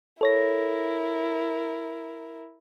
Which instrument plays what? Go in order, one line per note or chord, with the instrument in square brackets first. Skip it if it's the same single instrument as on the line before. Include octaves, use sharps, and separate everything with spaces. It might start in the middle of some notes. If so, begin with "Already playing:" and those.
[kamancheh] E4 A#4 [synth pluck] A4 C#5 A#6